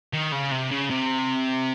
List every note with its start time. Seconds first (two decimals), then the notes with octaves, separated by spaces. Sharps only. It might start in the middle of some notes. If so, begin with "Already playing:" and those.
0.13 D#3
0.32 C#3
0.52 C3
0.71 C#3
0.90 C3